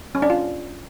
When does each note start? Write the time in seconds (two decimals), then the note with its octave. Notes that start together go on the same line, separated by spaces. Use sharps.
0.15 C#4
0.22 D4
0.30 F4